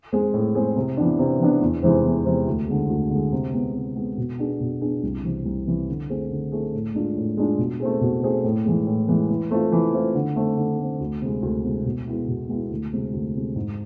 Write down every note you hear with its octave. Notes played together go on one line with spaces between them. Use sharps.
G#3 C4 G#4
A2
G#3 C4 G#4
C3
E3 B3 D4
C3
E3 B3 D4
E2
C3 E3 G#3 C4
E2
C3 E3 G#3 C4
D2
D3 G#3
D2
D3 G#3
C3
G#3 B3
C3
G#3 B3
B2
B3 D4 G#4
B2
B3 D4 G#4
C2
C3 E3
C2
C3 E3
D3
A3 C4 G#4
D3
A3 C4 G#4
A2
G#3 D4 F4
A2
G#3 D4 F4
B2
A3 C4 G#4
B2
A3 C4 G#4
A2
E3 G#3
A2
E3 G#3
E3
A3 C4 F4
E3
A3 C4 F4
D3
A3 C4
D3
A3 C4
D2
C3 G#3
D2
C3 G#3
B2
G#3 B3 E4
B2
G#3 B3 E4
D2
C3 G#3
D2
C3 G#3
G#2